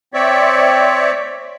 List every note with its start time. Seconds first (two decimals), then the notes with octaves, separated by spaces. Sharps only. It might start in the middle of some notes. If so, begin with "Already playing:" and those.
0.14 C4 C#5 D5 E5